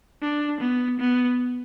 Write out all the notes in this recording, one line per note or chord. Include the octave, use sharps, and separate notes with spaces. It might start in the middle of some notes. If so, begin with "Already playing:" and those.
D4
B3
B3